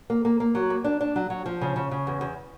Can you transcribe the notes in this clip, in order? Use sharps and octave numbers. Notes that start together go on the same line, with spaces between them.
A#3
A#3
A#3
F#3
A#3
D4
D4
F#3
F#3
F3
C#3
C#3
C#3
E2
E2